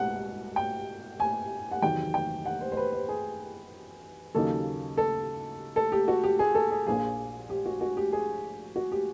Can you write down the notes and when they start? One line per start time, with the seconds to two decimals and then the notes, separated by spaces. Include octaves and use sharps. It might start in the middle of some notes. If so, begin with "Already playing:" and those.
Already playing: C2 B2 G#3 F#5
0.56 G5
1.20 G#5
1.72 F#5
1.82 E2 C3 D#3 F#3 G5
2.14 G5
2.46 F#5
2.61 C5
2.72 C5
2.77 B4
2.93 C5
3.09 G#4
4.35 D#2 C#3 F#3 A#3 D#4 A4
4.97 A4
5.76 A4
5.92 G4
6.08 F#4
6.24 G4
6.39 G#4
6.55 A4
6.71 G#4
6.87 A#1 A#2 F3 A#3 G#4
7.50 G4
7.66 F#4
7.81 F#4
7.97 G4
8.13 G#4
8.76 F#4
8.92 G4